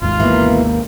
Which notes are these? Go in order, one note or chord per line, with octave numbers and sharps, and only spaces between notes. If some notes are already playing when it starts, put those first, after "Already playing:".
G#1 D#2 G#2 F4
B2 E3 A#3